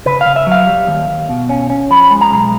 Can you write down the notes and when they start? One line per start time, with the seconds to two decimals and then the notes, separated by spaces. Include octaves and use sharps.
0.06 C#3 B4
0.21 C#3 F5
0.36 E5
0.47 F#3
0.52 F5
0.67 G3
0.87 D#2
1.08 D#2
1.29 B2
1.49 C#4
1.70 C#4
1.90 F3 B5
2.11 G#3
2.21 A#5
2.31 B1